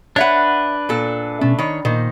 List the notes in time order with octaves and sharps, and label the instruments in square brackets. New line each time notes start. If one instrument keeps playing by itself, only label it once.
[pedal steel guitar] D4 B4 [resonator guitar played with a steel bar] C#5 E5 F#5
[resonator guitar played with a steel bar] A#2 A4
[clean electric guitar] B2 C#4 [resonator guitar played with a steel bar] A3
[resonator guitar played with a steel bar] D#3 C#5 [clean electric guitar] B5
[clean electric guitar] A#2 [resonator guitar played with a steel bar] D#3 A#3 C5